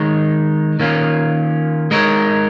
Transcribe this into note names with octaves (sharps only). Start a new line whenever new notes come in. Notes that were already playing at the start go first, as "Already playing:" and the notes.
Already playing: D#3 G#3 D#4 C#5
D#3 A#3 C#4 F4
G#3 D#4 A#4 C#5